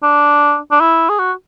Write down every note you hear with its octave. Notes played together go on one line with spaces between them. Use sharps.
D4
D4
E4
G#4
F#4